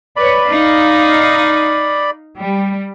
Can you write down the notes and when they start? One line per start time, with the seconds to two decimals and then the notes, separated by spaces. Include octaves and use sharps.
0.16 B4 C#5 D5 B5
0.49 D#4 F5
2.38 G3